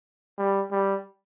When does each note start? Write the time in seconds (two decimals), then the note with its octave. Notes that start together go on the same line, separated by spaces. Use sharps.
0.38 G3
0.71 G3